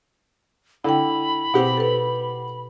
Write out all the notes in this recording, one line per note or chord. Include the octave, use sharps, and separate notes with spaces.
D3 E4 G5 B5
B2 C4 G4 F#5
A4 B4